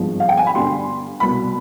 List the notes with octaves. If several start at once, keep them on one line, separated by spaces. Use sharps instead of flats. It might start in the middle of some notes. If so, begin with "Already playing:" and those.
Already playing: G#1 G2 F3 G#3 B3
F5
G5
G#5
B5
G2 D3 G3 B3 C6
C2 B2 B3 B5